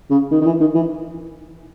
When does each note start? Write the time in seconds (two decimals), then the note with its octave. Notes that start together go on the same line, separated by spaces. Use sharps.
0.10 C#3
0.31 D#3
0.41 D#3
0.46 E3
0.60 D#3
0.74 E3